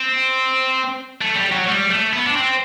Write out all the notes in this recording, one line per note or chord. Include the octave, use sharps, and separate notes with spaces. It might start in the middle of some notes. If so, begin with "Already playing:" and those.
Already playing: C4
A3
G3
F#3
G3
A3
B3
D4
C4